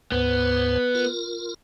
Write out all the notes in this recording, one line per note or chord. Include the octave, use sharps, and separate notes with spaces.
D2 G#2 B3 C5
F4 A#4